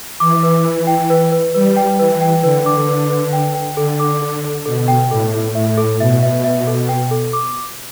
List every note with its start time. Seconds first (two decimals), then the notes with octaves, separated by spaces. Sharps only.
0.20 E3 D6
0.43 B4
0.65 B4
0.87 G5
1.10 B4
1.32 B4
1.54 G3 B4
1.76 G5
1.99 E3 B4
2.21 G5
2.43 D3 B4
2.66 D6
2.88 B4
3.10 B4
3.33 G5
3.55 G5
3.77 D3 A4
4.00 D6
4.22 A4
4.44 A4
4.66 B2 A4
4.88 G5
5.11 A2 A4
5.33 A4
5.55 A2 E5
5.78 A4
6.00 B2 E5
6.23 E5
6.44 E5
6.67 A4
6.89 G5
7.11 A4
7.33 D6